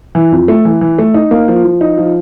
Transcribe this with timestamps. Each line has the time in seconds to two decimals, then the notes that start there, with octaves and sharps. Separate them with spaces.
0.15 E3
0.32 F2
0.48 A3
0.65 E3
0.81 E3
0.99 A3
1.14 D#4
1.31 A#3
1.48 F3
1.65 F3
1.81 D#4
1.98 F3